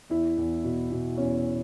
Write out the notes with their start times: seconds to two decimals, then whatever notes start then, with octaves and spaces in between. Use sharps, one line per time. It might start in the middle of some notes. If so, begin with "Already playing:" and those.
0.10 E2 E4
0.38 E2
0.64 B2
0.92 B2
1.18 E2 C#4